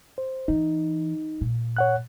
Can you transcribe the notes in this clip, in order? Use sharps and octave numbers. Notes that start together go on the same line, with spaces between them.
C5
E3 D#4
A#2
C#5 F#5 F#6